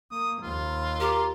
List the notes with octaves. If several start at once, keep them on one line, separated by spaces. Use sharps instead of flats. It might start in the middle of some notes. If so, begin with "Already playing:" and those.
A#3 D#6
D#2 F4
G4 A#4